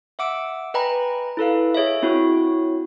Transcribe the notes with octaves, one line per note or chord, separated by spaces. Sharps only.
E5 F#5 D6 E6 D7
B4 D#5 G5 G#5 A#5 B5
E4 A4 B4 F5
G#4 C#5 D#5 E5
C4 E4 F#4 C#5